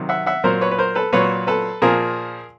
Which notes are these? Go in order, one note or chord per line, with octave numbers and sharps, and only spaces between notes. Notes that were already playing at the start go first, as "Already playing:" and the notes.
Already playing: C3 D#3 F#3
E5 F#5
E5 F#5
A#2 F#3 A#4 C5
B4 C#5
B4
A#4 C5
A4 B4
A#2 F#3 B4 C#5
A4 B4
A#2 F3 G#4 A#4